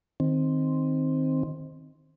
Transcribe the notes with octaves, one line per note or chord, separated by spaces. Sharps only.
D#3 C4